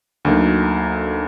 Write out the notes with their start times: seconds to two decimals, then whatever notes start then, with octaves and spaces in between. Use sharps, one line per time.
0.25 D2 D3 F#3 A#3 D#4